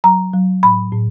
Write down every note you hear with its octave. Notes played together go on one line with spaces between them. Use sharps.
F#3 A#5
F#3
A2 B5
A2